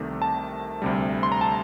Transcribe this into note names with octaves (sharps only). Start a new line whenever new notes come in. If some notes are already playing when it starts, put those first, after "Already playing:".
Already playing: C2 C3 D#3 A3
A5
D2 C3 G3
C6
A#5
A5